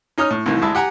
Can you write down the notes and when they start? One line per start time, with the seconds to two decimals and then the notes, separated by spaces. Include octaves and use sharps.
0.18 C#4 D#4 C#5 D#6 F6
0.30 A2
0.46 C2 A2 D#3 E3
0.61 D2 G#3 E4 A5 E6
0.75 G4 F#5 G#5 A#5